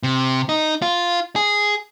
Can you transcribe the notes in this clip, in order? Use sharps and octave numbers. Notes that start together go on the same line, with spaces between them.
C3
D#4
F4
G#4